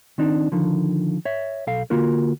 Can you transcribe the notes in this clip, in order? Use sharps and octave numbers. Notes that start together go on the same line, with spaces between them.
D#3 C4 D4 D#4
D3 D#3 F3
C#5 E5
B1 A4 F5
D3 A#3 F4 F#4 A#4